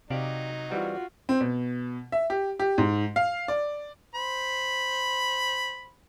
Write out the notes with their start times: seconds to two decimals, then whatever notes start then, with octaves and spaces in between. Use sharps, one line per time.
0.10 C3 F#3 D#4 G4 D5 F5
0.70 E3 G3 C4 F4 F#4
1.29 C4
1.41 B2
2.12 E5
2.30 G4
2.59 G4
2.78 G#2
3.16 F5
3.48 D5
4.15 C5 B5